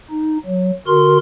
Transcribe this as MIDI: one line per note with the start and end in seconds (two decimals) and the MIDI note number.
0.10 0.37 63
0.46 0.71 54
0.87 1.18 50
0.87 1.18 66
0.87 1.18 70
0.87 1.18 84